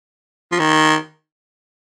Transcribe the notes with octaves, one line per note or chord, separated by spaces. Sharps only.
F3
D#3